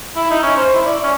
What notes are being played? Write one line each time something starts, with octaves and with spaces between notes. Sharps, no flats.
E4
D#4
C#4
C5
E4
D5
C#4